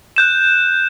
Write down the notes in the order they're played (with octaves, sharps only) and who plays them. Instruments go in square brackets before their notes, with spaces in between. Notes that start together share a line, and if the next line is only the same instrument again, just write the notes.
[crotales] F#6 G6 E7